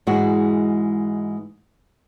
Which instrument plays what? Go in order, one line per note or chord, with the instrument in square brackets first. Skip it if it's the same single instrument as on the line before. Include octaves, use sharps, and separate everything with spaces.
[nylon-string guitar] G#2 E3 G#3 F#4